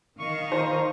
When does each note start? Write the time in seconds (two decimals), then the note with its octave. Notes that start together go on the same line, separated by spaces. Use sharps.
0.19 D#3 D#5 F5 C#6
0.52 C5 A#5